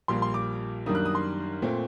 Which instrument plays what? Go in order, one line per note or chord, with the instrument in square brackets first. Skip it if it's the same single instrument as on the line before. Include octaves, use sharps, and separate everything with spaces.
[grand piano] A#1 A#2 G3 A#3 C6
C6
D6
F#2 D#3 G3 A#3 D4 D#6
F#6
D#6
C6
A#2 A3 C4